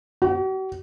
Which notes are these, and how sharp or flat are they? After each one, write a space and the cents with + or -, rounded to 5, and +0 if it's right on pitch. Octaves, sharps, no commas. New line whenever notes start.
F#4 +45